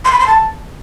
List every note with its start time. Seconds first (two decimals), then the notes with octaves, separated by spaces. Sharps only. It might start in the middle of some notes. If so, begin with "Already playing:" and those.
0.05 C6
0.12 B5
0.20 C6
0.27 A5